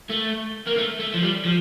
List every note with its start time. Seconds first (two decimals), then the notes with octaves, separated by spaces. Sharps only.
0.10 A3
0.67 A#3
0.77 A3
0.99 A3
1.14 F3
1.22 G3
1.45 F3